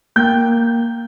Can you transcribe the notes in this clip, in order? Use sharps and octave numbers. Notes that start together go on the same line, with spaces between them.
A#3 G5 G6